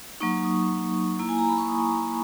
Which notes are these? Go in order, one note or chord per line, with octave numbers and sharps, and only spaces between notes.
F#3 A#3 D#4 C#6
D#6
A#3 E4
G#5
A#5
B5
C#6
D#6